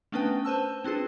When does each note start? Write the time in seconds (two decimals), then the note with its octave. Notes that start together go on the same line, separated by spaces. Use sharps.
0.12 A3 B3 C#4 D4 B4 G5
0.45 B4 C5 A5 E6
0.84 C4 D4 F4 G#4 B4